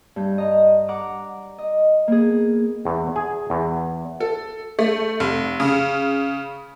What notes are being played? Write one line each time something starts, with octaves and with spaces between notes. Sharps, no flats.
G2 G6
D#5 A#5
F#5 A#5 D6
D#5
A#3 B3 G#4
E2
G#4
E2
A4
A3
F1
C#3